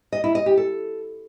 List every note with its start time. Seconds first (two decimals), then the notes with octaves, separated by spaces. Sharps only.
0.12 D#5
0.24 E4
0.35 D#5
0.46 G4
0.57 A4